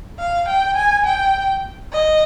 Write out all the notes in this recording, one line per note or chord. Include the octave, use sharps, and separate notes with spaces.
F5
G5
G#5
G5
D#5